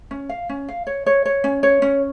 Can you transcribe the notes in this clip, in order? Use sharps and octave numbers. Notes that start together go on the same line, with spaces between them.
C#4
F5
C#4
F5
C#5
C#5
C#5
C#4
C#5
C#4